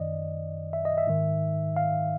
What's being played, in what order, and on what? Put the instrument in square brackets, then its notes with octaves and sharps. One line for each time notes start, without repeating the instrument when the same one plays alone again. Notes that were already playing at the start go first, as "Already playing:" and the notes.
Already playing: [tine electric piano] F#2 D#3 D5 D#5
E5
D#5
E5
G#2 D#3
F5